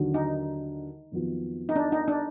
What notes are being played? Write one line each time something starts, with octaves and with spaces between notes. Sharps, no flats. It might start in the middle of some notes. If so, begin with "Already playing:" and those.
Already playing: D#2 D3 F#3
D#4
F2 D#3 F#3 B3 F4
D#4
D4
D#4
D4